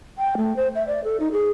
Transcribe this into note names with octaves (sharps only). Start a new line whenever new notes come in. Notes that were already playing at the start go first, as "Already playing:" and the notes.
G5
A3
C5
E5
D5
A4
D#4
G#4